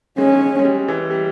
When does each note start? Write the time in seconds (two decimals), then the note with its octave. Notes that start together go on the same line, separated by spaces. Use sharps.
0.18 G#3 C#4
0.59 G#3
0.65 G3
0.88 E3
1.10 G3